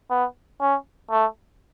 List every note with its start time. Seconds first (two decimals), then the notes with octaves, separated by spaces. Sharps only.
0.10 B3
0.61 C#4
1.11 A3